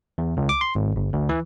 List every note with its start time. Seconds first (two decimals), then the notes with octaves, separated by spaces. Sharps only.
0.18 E2
0.37 C#2
0.49 D6
0.61 C6
0.75 G#1
0.96 G1
1.13 D2
1.29 E3